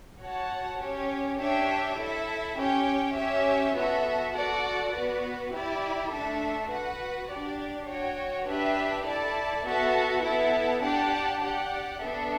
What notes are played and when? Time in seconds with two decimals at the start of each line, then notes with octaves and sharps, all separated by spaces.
0.21 F#4 C#5 F#5 A5
0.80 C#4 G4 C#5
1.39 D4 G4 C#5 E5 G5
1.98 E4 A4 E5
2.57 C#4 G4 C#5 G5
3.16 C#4 G4 C#5 E5
3.75 B3 F#4 A4 E5
4.34 F#4 A4 D5 F#5
4.93 B3 F#4 B4
5.52 E4 G4 D5
6.11 A3 D4 A4 E5
6.70 F#4 B4 F#5
7.29 D4 G4 D5
7.88 F#4 C#5 G5
8.47 D4 G4 B4 E5 G5
9.06 E4 A4 D5 A5
9.65 B3 F#4 A4 E5 A5
10.24 B3 E4 A4 E5 A5
10.82 D4 G4 D5 F#5 A5
11.42 G4 D5 F#5
12.01 B3 D4 A4 E5